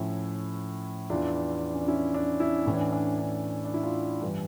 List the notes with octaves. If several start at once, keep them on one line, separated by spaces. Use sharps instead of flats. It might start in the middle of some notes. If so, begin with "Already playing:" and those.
Already playing: A2 F3 C#4 E4
E2 E3 D4 F4
C#4
D4
C#4 E4
D4
C#4 E4
A2 E3 C#4
D4
C#4
D4
D4
D4
E4
D4 F4
G2 E3